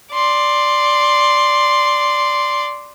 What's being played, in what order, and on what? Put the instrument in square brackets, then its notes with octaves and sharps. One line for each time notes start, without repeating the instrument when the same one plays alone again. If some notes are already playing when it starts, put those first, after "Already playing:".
[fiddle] D5 C6